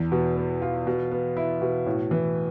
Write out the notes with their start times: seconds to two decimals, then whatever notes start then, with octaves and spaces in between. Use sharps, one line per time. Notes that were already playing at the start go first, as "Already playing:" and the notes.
Already playing: E2
0.12 B2
0.36 B3
0.62 F4
0.87 B2
1.11 B3
1.37 E4
1.62 B2
1.86 A2
2.11 E3